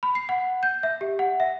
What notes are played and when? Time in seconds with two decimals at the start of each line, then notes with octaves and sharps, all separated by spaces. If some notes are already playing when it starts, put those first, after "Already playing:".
0.03 B5
0.15 C7
0.29 F#5
0.63 G6
0.83 E5
1.01 G4
1.19 F#5
1.40 E5